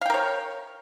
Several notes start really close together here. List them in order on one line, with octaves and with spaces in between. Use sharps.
F5 G5 A#4 C#5